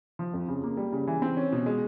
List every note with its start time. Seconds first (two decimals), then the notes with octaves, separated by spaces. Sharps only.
0.19 F3
0.33 F2
0.48 C#3
0.64 A#3
0.77 G3
0.92 C#3
1.07 E3
1.22 C4
1.37 C#4
1.52 B2
1.66 G#3